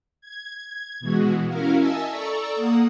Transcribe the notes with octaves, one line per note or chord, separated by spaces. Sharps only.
G#6
B2 E3 G#3 F#4
C#4 E4 F#4 A#4 F5
D#5 E5 G#5 A5 E6
A4 D5 A#5 C#6 E6
A#3 F#5 D#6